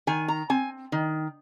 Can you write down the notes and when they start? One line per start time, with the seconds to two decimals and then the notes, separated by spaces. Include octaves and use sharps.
0.07 D#3 G#5
0.28 A#5
0.50 C4 G#5
0.92 D#3